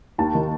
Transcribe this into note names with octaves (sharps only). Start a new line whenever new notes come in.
D#2 A5
D#3